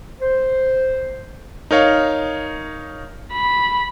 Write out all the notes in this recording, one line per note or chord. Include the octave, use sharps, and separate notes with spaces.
C5
D#4 A#4 C#5 F5
B5